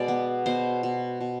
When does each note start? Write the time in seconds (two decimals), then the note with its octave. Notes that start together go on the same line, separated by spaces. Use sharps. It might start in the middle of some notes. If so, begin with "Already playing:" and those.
Already playing: B2 G#3 D5
0.08 B3
0.46 B2 C5
0.83 B2
1.21 B2